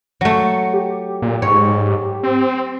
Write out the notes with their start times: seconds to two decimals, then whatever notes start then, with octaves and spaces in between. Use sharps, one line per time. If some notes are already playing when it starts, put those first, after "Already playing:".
0.21 F#3 A3 C#7
0.74 G4
1.22 A#2
1.42 G#2 C#5
2.23 C4